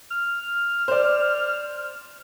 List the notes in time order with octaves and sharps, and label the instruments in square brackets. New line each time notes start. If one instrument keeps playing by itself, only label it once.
[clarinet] F6
[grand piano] C5 D5